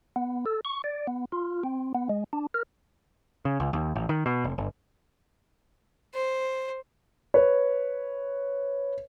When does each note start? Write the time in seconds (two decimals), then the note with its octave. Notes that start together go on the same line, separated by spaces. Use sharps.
0.16 B3
0.46 A4
0.65 C#6
0.84 D5
1.07 B3
1.32 F4
1.64 C4
1.95 B3
2.09 G#3
2.33 D4
2.54 A#4
3.45 C#3
3.60 C#2
3.73 D#2
3.96 A1
4.09 D#3
4.26 B2
4.44 F1
4.58 G1
6.14 C5
7.34 B4 C#5